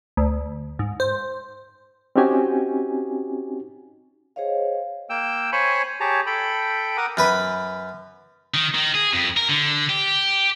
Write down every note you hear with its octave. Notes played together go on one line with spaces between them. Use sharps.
D2
G#2
C5
C4 C#4 D#4 F#4 G4 G#5
G#4 C5 C#5 D#5 F5
A#3 G5 E6
C5 C#5 G#5 B5 C#6
G4 G#4 C#5 A5 A#5
A4 G5 B5
A#4 F#5 D6 D#6
F#2 B4 B5
D#3
D#3
G#4
F2
A#4
D3
G4